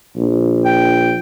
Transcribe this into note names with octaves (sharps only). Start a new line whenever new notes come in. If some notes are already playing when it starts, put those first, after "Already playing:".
A#1
G5